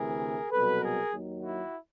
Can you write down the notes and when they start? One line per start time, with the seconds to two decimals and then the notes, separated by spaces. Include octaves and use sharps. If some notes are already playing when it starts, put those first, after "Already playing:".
Already playing: D2 C3 E3 G#4 A#4
0.50 C2 B2 F#3 A4 B4
0.81 G#4 A#4
1.12 D#2 D#3 F#3
1.43 E4 F#4